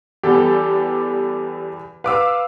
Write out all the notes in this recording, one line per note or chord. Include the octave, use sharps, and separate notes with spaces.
E2 G3 G4 A4
B4 F5 D6 E6